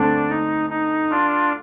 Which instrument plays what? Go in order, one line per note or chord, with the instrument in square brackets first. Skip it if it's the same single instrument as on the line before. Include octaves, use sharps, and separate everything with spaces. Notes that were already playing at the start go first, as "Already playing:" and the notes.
Already playing: [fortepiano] D2 D3 A3 C4 [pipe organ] D4
[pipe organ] D#4
D#4
D4 F4